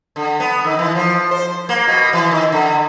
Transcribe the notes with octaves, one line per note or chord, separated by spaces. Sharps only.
D3
B3
D#3
E3
F3
C5
A#3
B2
E3
D#3
D3